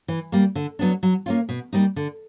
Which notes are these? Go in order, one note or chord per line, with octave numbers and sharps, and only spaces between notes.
E3
G3 A#3
D3
F#3 B3 D4
F#3
A#3 C#4 F4
B2
G3 A#3 D#4
D3